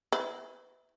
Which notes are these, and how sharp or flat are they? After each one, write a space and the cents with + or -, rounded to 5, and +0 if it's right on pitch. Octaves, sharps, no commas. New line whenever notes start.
E4 -15 B4 +35